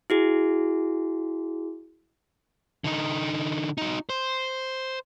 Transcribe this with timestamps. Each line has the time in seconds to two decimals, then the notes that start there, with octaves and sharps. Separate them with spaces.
0.10 E4 F#4 G#4
2.84 D3 D#4
3.78 D#4 F#4
4.10 C5